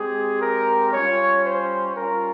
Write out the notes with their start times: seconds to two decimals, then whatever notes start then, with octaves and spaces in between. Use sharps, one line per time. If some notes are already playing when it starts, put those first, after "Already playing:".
Already playing: G#3 C4 G4 G#4
0.41 A#4
0.93 G3 C#4 F4 C#5
1.45 C5
1.96 G3 C#4 F4 A#4